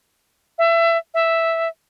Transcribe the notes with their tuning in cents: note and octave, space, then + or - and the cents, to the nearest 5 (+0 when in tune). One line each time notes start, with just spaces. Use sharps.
E5 +25
E5 +0